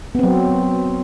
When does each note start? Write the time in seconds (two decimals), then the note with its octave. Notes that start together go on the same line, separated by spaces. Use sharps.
0.15 B3
0.19 C4
0.23 F#3